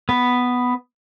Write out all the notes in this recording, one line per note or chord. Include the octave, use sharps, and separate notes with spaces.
B3